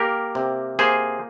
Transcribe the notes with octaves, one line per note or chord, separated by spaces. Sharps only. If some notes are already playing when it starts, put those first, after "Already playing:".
Already playing: A#3 G4 A#4
C3
A#3 G#4 C5